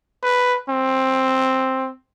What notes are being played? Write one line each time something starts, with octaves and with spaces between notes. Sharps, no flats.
B4
C4